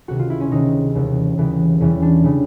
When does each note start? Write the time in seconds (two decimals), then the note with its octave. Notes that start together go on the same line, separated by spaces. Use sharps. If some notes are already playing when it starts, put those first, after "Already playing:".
0.08 C#2 C3 D#3 F#4
0.19 F4
0.30 E4
0.40 C#4
0.51 C#2 C3 D#3 D#4
0.95 D#2 C#3 E3 G3
1.38 D#2 C#3 E3 G3
1.80 E2 C#3 E3 G3 C#4
2.02 D4
2.23 C#3 E3 G3